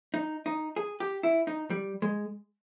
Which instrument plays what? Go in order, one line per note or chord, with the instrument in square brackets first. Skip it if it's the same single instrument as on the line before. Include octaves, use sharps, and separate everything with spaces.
[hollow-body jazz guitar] D#4
D#4
G#4
G4
E4
D#4
G3
G#3